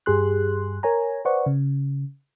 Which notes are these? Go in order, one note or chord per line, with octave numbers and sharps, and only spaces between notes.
G2 G4 G#4 C6 F#6
A#4 C#5 G#5 A#5
B4 C5 D5 F#5 C#6
C#3